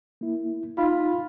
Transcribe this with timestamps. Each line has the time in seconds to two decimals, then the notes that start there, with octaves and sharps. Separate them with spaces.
0.21 A#3 E4
0.78 D#4 F4 B5